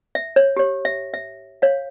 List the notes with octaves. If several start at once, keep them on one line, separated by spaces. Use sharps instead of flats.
E5
C#5
G4 C#5
E5
E5
C#5 F5